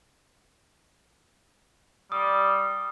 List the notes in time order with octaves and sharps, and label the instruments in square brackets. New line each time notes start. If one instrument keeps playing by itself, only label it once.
[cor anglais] G3 [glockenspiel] D#6